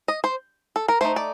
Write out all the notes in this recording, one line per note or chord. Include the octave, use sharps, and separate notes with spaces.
D#5
C5
A4
A#4
A3 D#4 C5
D5